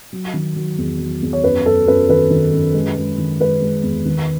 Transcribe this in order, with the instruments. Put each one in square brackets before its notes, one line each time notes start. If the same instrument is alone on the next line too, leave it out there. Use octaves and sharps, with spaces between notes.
[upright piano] F#3
D#3
F#3
E2
F#3
E2
C#5
F#2 B4
F#2 A4
F#2 B4
D#3 B4
D#3
F#2
G#3
G#3
D#3
G#3 B4
G#3
E2
D#3